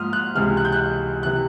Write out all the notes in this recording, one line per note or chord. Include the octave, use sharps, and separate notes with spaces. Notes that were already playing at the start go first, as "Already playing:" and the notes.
Already playing: G#2 F3 A#3 C6 D#6 F6
F#6
C#2 C3 E3 G#3 F6
F#6
G6
F#6
C3 E3 F#6